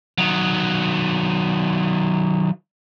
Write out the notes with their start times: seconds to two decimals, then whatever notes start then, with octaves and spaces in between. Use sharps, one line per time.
0.18 D#3 F#3